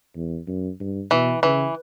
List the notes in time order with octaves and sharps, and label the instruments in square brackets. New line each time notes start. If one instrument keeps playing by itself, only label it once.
[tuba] E2
F#2
G2
[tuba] B2 [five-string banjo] E3
[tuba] C#3 [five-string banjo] E3